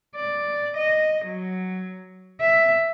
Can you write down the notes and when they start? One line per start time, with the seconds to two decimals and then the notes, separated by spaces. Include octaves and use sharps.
0.16 D5
0.77 D#5
1.25 F#3
2.41 E5